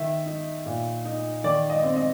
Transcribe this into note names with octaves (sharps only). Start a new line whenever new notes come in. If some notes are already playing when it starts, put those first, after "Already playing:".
Already playing: D#3 E5
D#4
A#2
D#4
D#3 D5
D#5
C4
D#5